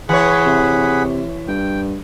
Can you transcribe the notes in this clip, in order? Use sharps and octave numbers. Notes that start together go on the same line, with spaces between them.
E3 G#4 C#5 F#5 B5
C3
G2 G5